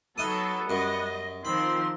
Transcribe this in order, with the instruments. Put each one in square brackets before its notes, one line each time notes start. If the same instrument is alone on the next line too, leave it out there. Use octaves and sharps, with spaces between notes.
[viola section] F#3 A4 [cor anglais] B3 [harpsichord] D#4 D#6
[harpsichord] F#2 [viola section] G3 D#5
[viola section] D#3 F3 C6 [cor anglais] C4 [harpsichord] B5